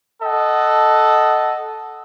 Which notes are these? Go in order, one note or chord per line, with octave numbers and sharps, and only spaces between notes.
A4 D#5 F#5